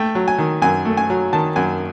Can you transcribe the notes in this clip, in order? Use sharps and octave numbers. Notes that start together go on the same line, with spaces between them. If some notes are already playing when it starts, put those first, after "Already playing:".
Already playing: A3 G5
F#3
G#5
D#3
F#2 G#5
A3
G#5
F#3
D#3 A5
F#2 G#5